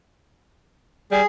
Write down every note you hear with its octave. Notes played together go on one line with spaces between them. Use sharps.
G3 G#4